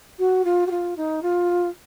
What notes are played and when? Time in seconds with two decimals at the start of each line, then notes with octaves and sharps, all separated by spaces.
0.19 F#4
0.45 F4
0.67 F#4
0.71 F4
0.97 D#4
1.22 F4